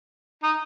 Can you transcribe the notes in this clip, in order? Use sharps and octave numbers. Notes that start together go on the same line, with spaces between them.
D#4